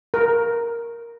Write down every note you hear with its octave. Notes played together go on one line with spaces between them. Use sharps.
A#4